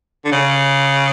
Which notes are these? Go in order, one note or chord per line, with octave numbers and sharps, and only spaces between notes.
D3
C#3